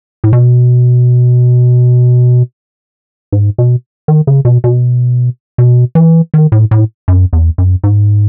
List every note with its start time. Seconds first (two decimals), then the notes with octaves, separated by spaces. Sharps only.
0.24 A2
0.33 B2
3.32 G#2
3.58 B2
4.08 D#3
4.27 C#3
4.45 B2
4.64 B2
5.58 B2
5.95 E3
6.34 D#3
6.52 A2
6.71 A2
7.08 F#2
7.33 E2
7.58 F#2
7.84 G#2